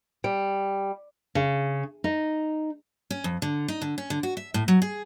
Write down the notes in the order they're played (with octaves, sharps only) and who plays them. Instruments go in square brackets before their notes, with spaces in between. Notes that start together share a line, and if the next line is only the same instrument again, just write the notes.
[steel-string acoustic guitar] G3
[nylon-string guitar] C#3
D#4
[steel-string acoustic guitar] C#4
F2
D3
D#4
D3
C#4
D3
F#4
E5
A2
F#3
G#4